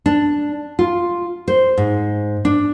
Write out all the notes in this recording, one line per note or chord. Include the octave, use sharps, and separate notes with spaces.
D4
F4
C5
G#2
D4